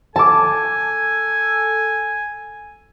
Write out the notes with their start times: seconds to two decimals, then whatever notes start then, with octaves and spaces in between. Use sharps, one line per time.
0.16 A4 G#5 A5 D6